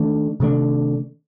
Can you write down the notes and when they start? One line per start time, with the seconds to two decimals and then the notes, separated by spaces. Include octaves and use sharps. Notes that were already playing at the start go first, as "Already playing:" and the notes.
Already playing: D#3 A3 D4
0.40 C3 D#3 A3 D4